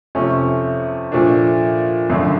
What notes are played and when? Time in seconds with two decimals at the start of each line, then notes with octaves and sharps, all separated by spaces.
0.15 F2 C3 F3 A3 C#4
1.12 A#2 F3 A3 D4
2.09 G#1 F#2 D3 F3 A3